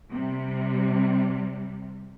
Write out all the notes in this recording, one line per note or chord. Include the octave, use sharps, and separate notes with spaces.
C3 G3